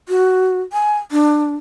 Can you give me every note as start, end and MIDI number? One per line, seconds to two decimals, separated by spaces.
0.09 0.61 66
0.73 0.98 80
1.11 1.56 62